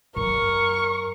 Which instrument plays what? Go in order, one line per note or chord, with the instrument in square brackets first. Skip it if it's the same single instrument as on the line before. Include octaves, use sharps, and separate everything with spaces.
[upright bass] F#2 [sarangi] A#4 [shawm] C#6